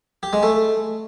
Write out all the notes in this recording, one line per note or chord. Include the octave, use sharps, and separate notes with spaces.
G4
G#3
A3